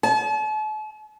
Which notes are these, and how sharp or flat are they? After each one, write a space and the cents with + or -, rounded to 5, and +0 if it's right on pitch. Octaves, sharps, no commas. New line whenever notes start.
A5 -40